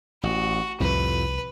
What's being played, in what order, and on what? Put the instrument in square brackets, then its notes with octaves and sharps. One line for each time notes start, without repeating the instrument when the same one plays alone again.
[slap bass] A1 [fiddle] F#4
[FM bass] C2 [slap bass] F2 A2 C3 [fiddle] B4